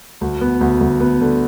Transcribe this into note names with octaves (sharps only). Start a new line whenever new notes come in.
D2
B3
D2
D2
B3
D3